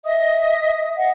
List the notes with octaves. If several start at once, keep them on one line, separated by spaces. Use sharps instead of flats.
D#5 E5 D#6
D#5 F#5